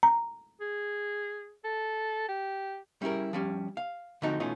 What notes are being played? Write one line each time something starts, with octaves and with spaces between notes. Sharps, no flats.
A#5
G#4
A4
G4
G3 C#4 E4 G#4 A#4
F3 G3 C#4
F5
D3 F3 A3 C4 D#4 F#4
B2 E3 A3 C#4 D#4 F4